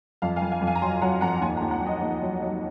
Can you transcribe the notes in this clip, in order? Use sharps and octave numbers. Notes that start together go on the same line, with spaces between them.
F2 F5
F5 G#5
F2
F5 G#5
F2
F5 G#5
A#5
F#3 G#5 C6
F#3 F#5 A#5
F2 F#5 A#5
D#2 G#5 C6
F#5 A#5
D#2
F#5 A#5
F#3
D#5
D#2
F#3
F#3